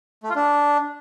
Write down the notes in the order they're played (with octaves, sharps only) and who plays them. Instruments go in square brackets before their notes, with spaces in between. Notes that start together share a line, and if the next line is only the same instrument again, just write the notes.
[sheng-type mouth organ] A3
F4
D4